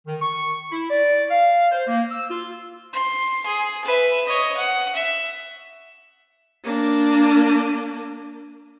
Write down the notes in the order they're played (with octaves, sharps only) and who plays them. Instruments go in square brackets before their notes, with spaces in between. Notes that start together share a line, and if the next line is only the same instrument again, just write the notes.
[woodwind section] D#3
C#6
E4
D5
F5
C5
A#3
E6
F4
[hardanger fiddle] C6
G#4
B4 E5
C#5 D#5
F#5
E5
[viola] A#3 D4